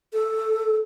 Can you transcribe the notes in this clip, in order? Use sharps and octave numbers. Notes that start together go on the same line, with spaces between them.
A4